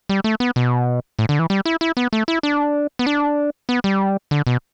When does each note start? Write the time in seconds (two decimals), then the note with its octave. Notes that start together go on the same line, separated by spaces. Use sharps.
0.09 G3
0.24 A3
0.40 B3
0.56 B2
1.19 A2
1.29 D3
1.39 E3
1.50 G3
1.66 E4
1.81 E4
1.97 B3
2.13 A3
2.28 E4
2.43 D4
2.99 B3
3.06 D4
3.69 B3
3.84 G3
4.31 D3
4.47 B2